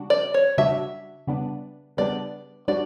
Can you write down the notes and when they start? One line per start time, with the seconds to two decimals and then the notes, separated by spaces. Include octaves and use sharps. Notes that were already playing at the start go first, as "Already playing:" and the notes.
Already playing: C#3 G3 D4 F#4
0.10 D5
0.34 C#5
0.58 C#3 G3 D4 F#4 E5
1.27 C#3 G3 B3 D4
1.97 C#3 G3 B3 D4 D5
2.68 G3 D4 F#4 D5